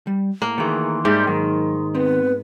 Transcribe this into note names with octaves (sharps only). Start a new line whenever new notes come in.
G3
A2 A#3
D#3 E3 A3 F#4 G#4 C6
G#2 G3 G4 E5
D#3 F#3
B3 C4 B4